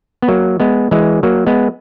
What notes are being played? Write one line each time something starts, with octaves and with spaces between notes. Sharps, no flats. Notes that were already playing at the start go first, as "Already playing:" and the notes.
B3
F#3 A#3
G#3 B3
E3 G#3
F#3 A#3
G#3 B3